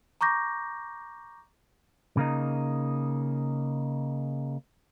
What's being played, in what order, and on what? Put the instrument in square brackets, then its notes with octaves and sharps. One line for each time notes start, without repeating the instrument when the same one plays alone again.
[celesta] A#5 C#6 D6 G6 A#6
[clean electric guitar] C#3 A#3 D#4